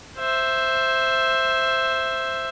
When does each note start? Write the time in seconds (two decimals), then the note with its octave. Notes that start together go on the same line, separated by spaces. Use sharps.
0.18 C5 E5